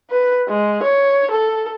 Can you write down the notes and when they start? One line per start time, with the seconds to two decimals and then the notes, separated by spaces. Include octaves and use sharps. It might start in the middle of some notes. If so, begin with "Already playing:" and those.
0.11 B4
0.48 G#3
0.83 C#5
1.31 A4